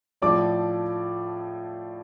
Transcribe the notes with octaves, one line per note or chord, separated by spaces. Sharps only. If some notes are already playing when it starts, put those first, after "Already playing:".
A2 F3 A3 D5 D6